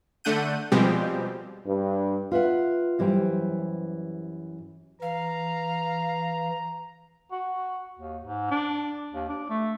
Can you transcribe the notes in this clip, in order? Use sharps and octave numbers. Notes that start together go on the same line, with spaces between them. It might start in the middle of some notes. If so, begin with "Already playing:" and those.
D3 A3 D4 F#5 G6 D#7
B2 F3 G3 G#3 C4 G4
G2
F4 B4 E5 F#5
F#2 E3 G3 C5 G5
E3 F5 A#5
F#4
D#2
G#2
D4
D#2
D4
A3